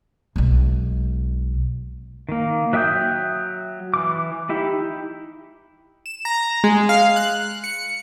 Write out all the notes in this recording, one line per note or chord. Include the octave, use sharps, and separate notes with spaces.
B1 G#3
D#3 A#3
F#3 E5 G5 D#6 G6
E3 D6
D#4 E4 G4
E7
A#5
G#3
F5
F#6
C#7